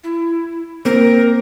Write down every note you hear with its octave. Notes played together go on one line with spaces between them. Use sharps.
E4
A#3 C4 A#4